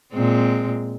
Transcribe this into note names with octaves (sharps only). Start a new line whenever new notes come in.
A#2 G#3 C4